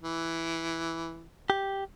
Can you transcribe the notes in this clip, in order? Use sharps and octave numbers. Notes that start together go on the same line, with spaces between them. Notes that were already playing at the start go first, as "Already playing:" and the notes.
E3
G4